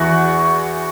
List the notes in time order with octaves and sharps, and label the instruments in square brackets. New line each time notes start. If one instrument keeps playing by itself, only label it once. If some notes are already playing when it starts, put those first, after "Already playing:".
Already playing: [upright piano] E2 E3 [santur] F#4